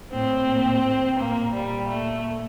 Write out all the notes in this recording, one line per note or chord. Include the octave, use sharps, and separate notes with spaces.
A2 C4
A#2
A2
A#2 A#3
A#2 G3
A#2 A3